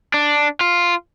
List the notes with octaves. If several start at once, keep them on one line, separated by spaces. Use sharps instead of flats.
D4
F4